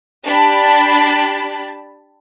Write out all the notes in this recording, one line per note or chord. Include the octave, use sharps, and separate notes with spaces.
D4 G4 A5 B5